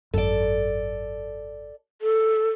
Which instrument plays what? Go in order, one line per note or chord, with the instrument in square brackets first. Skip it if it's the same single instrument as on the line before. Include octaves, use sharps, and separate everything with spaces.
[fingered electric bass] G#1 F#2 [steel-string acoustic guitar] A4 D5
[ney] A4